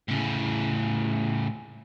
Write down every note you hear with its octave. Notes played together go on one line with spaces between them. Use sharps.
A2 C#3